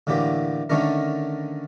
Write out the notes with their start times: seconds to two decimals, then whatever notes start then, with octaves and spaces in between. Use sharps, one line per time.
0.07 A2 D3 E3 A#3 G4
0.70 D3 D#3 A3 C#4 D4 A#4